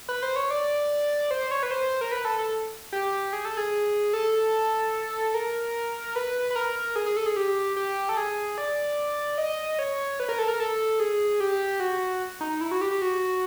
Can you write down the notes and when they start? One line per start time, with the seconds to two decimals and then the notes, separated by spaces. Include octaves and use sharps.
0.09 B4
0.23 C5
0.36 C#5
0.51 D5
1.31 C5
1.51 C#5
1.63 B4
1.71 C5
2.01 A#4
2.12 B4
2.25 A4
2.38 A4
2.93 G4
3.33 G#4
3.45 A4
3.57 G#4
4.13 A4
5.34 A#4
6.16 B4
6.50 B4
6.56 A#4
6.96 G#4
7.06 G#4
7.17 A4
7.26 G#4
7.36 G4
7.76 G4
8.09 A4
8.17 G#4
8.58 D5
9.38 D#5
9.79 C#5
10.20 B4
10.29 A#4
10.39 A4
10.48 A#4
10.60 A4
11.00 G#4
11.40 G4
11.80 F#4
12.41 D#4
12.61 E4
12.71 F#4
12.81 G4
12.91 G4
13.02 F#4